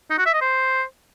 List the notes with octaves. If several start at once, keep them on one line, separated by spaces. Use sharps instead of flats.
D#4
F#4
E5
D#5
C5